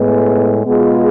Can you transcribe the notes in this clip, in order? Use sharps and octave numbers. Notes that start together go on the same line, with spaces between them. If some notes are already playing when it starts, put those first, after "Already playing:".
Already playing: A2 G#3 B3
B2 G#3 B3 F4 G#4